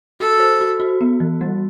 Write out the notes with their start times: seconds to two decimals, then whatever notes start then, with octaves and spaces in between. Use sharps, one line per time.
0.20 F#4 A4
0.40 C5
0.61 F#4
0.80 F#4
1.01 B3
1.20 E3
1.41 G3